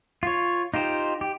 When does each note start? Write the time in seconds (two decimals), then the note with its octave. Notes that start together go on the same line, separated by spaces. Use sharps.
0.23 F4 C#5
0.74 D#4 F4 G4 C5
1.21 G4